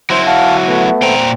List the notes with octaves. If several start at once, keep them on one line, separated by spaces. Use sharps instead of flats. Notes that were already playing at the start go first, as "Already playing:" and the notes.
F#3 E4 C5
F#4 F5 A5
A3 B3
A#2 C4 G5 A#5